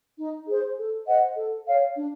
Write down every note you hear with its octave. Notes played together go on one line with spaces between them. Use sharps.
D#4
G#4 C5
A4
C5 D#5 F#5
A4
C#5 F5
D4